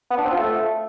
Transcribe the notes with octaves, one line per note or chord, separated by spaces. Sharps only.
B3
D4
C4
F4
A3